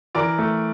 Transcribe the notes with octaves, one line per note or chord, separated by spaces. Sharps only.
E3 A#4 D5
A3